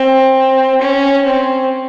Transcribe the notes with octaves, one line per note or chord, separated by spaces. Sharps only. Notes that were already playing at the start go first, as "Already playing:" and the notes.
Already playing: C4
C#4
C4